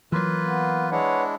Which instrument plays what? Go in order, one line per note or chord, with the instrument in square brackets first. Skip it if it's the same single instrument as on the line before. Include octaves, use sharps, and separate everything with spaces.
[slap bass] E3 F#3 [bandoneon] A#3 F4 B4
[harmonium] B3
[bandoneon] G#3 D4 E4 [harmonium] B4 C#5 F#5